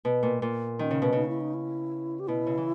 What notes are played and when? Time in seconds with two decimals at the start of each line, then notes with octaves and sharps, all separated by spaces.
0.05 B2
0.23 A#2
0.42 A#2
0.79 D#3 C#4
0.91 C#3
1.02 B2
1.12 C#3 D#4
1.28 E4
1.40 D#4
1.54 E4
2.20 G4
2.28 B2 E4
2.47 C#3
2.58 E3